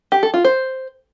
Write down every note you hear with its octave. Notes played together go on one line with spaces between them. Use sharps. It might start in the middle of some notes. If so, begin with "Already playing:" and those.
G4
A4
F4
C5